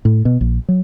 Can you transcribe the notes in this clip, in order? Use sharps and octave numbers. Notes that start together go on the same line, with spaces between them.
A2
B2
A#1
F#3